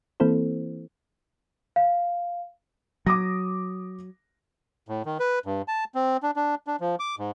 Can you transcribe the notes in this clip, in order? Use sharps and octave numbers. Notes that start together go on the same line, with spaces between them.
E3 A#3 C4 E4 A4 C5
F5
F#3 D6 D#6 A#6
A2
D#3
B4
G2
A5
C4
D4
D4
D4
F3
D6
G#2